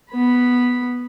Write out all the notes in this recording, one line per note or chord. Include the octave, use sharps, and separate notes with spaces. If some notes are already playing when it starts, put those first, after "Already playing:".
B3 B5